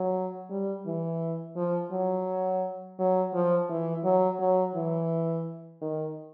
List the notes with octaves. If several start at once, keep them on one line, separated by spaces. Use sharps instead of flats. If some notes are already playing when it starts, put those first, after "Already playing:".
Already playing: F#3
G3
E3
F3
F#3
F#3
F3
E3
F#3
F#3
E3
D#3